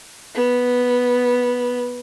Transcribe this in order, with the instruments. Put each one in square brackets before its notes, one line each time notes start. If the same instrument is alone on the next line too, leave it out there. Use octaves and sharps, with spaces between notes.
[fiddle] B3